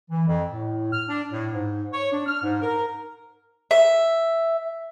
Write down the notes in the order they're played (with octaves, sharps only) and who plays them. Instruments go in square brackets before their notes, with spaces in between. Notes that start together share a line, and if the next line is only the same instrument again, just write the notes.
[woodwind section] E3
F2
A2
F6
D4
A2
G#2
C#5
D4
F6
G#2
A#4
[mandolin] E5